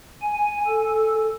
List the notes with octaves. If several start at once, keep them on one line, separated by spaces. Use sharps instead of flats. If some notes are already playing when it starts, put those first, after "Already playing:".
G#5
A4